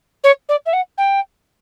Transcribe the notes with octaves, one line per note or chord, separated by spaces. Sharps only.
C#5
D5
E5
F#5
G5